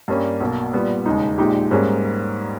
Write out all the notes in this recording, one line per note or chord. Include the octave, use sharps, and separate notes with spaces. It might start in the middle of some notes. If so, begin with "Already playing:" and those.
G2 G3 A#3 C#4
B1 B2 A#3
A#2 G3 B3
E1 D#2 C#3 G#3 D#4
A#1 A#2 G#3 D#4 G4
G#2 G3 A#3 C#4 G#4